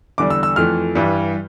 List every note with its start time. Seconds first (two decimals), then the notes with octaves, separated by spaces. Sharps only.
0.18 E2 D3 G3 D6
0.30 E6
0.43 E6
0.56 F2 E3 A3 F6
0.95 G2 E3 G3